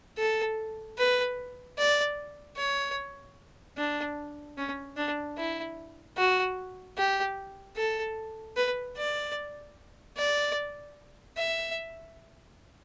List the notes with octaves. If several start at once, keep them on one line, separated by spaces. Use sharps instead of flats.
A4
B4
D5
C#5
D4
C#4
D4
E4
F#4
G4
A4
B4
D5
D5
E5